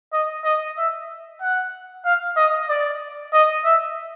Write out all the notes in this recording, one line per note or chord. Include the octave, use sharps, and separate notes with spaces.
D#5
D#5
E5
F#5
F5
D#5
D5
D#5
E5